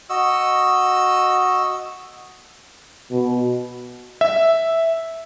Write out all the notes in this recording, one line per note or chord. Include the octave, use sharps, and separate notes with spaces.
F#4 D#5 E6
B2
E5